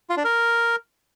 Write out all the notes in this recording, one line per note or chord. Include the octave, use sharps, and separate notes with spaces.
F4
D4
A#4